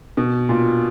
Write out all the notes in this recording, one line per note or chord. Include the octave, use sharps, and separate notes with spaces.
B2
A#2